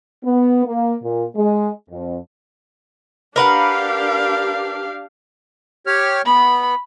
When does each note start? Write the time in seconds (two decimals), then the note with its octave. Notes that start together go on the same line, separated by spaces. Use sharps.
0.24 B3
0.65 A#3
1.02 A#2
1.35 G#3
1.89 F2
3.36 D4 G4 A#4 B4 F5 F#5
5.87 G4 C#5 F6
6.26 B3 B5